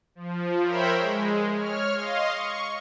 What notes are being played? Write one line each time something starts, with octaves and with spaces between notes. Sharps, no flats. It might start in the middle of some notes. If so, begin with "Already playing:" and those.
F3
A#4 C5 C#5 E5 G5 B5
G#3
C#5 F6
D#5 F5 C6
C#6